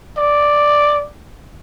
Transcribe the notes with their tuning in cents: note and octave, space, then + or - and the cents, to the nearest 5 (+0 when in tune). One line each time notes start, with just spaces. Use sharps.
D5 +0